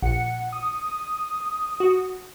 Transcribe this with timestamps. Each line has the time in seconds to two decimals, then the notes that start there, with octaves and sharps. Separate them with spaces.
0.02 A#1 F#5 C#7
0.52 D#6
1.80 F#4